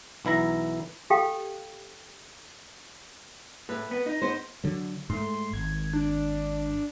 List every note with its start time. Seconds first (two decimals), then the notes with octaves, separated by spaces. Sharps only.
0.25 B1 E3 E4 A#5
1.10 G4 A4 F5 G5
3.69 A2 B4
3.91 B3
4.06 D#4
4.22 B3 C5
4.64 D3 F#3
5.10 G#2 A3 C6
5.53 G#1 G#6
5.94 D4